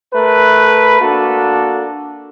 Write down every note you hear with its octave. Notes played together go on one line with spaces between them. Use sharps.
A3 A#4 B4
A#3 D4 F#4 A4